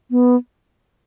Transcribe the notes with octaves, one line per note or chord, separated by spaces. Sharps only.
B3